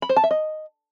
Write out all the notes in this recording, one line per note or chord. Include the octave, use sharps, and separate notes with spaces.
B5
C5
A5
E5
D#5